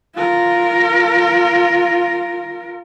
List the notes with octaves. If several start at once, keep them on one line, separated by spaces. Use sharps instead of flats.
F4 A#4